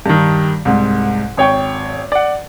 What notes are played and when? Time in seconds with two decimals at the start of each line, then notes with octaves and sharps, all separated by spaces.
0.06 G2 D#3
0.65 C2 G#2
1.37 G#1 C#5 G5 C#6
2.12 D5 F#5